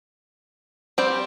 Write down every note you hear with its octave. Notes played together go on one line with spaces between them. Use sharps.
G3 C4 G4